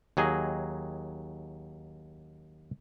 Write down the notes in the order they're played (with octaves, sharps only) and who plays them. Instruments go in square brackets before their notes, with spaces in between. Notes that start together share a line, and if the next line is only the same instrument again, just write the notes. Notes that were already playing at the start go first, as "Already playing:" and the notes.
[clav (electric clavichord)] D#2 F#3 G#4 D#5